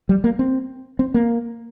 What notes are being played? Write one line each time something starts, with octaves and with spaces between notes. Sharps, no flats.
G3
A#3
C4
C4
A#3